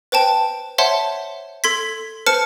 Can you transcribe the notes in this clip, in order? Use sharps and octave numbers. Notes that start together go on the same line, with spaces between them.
B4 C5 G5 A5
C5 C#5 E5 F#5 A5 C6
A4 C6 G#6 B6
B4 C5 A5 F6 C#7